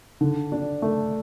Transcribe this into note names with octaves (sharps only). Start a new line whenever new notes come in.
D3
D4
A3